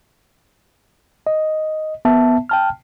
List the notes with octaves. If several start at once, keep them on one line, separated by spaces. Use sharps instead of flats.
D#5
B3 E5 A5
G5 A5 F6